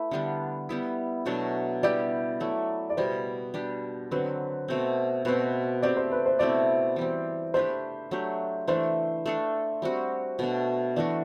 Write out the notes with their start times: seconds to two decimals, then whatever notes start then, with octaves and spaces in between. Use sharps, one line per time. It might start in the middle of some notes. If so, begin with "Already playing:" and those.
Already playing: A3 E4 B4
0.11 D3 G3 B3 D4
0.69 G3 B3 E4
1.26 B2 F#3 A3 D4
1.83 G3 B3 E4 G4 D5
2.40 F#3 A3 E4
2.90 D5
2.97 B2 G3 B3 C5
3.54 G3 D4 G4
4.11 D3 F#3 C4 B4
4.68 B2 A3 C4
5.25 B2 A3 C4 B4
5.82 A3 C4 G4 D5
5.97 C5
6.12 B4
6.26 C5
6.39 B2 A3 C4 E4 D5
6.96 E3 G3 C4
7.54 A3 D4 G4 B4 C5
8.11 F#3 A3 D4 G4
8.68 E3 A3 D4 C5
9.26 A3 D4 A4
9.82 G3 C4 F#4
10.39 B2 A3 D4
10.96 E3 A3 D4 F#4 D5